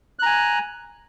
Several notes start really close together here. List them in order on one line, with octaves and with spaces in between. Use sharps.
F#6 A#5 G#5